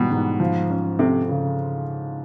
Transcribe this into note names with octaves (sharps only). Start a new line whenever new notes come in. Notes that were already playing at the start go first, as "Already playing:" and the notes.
Already playing: G#2 B2 E3 G3
G#2
F3
C#4
C3 A3
C#3